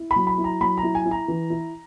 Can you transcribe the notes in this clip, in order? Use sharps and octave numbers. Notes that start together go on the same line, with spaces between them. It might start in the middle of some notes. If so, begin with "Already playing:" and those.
Already playing: E4
B5
F#3
B5
E4
A#5
F#3 B5
A#5
E4
G#5
E4
A#5
E3
E4